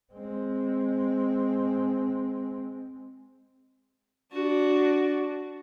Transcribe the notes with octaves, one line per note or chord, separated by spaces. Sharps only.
G#3 C4
D4 F#4